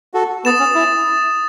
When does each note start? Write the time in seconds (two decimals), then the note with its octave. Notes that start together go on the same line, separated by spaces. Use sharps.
0.14 F#4 A4
0.45 B3 D#6 A6 E7
0.60 C#4
0.75 E4